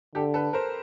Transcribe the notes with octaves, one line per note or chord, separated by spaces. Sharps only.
D3 G4 A4
A4 B4
A#4 C5